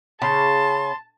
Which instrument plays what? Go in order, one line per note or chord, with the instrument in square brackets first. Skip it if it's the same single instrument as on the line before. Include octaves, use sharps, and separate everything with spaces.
[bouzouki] C#3 [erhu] A5 [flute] C6